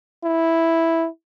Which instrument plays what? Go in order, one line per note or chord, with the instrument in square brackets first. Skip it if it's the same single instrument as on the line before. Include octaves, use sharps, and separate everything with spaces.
[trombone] E4